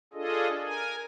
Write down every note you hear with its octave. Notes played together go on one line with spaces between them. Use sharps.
D4 F4 G#4 A4 D#5
A#4 G#5